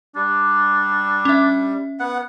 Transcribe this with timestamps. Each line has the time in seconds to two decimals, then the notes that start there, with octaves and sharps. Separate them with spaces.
0.15 G3 D4
1.25 C#4 E5
2.00 B3 F#5